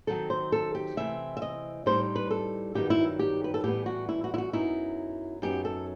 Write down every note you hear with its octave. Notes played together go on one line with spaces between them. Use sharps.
D#3 F#3 C4 D#4 A4
C5
A4
G4
C3 E3 A3 C4 E5
E5
D#5
A2 G3 C4 D#4 C5
B4
A4
G2 D#3 F#3 B3 D#4 G4
E4
G4
B4
A4
A2 E3 G3 B3 G4
F#4
E4
F#4
E4
F#4
F#2 F#3 B3 D#4 E4
F#2 F#3 B3 D#4 G4
A4